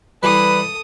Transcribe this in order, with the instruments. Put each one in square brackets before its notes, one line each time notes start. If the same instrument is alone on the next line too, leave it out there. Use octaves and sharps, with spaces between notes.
[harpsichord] E3 G3 [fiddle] A4 D#6 [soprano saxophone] B4